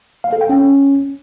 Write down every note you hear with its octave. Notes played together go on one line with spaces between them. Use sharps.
F5
A4
G5
C#4